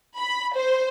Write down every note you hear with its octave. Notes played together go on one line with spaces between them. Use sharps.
B5
C5